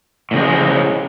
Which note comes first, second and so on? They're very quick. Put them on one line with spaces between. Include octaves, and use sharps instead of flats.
A2 C#3 F3 G#3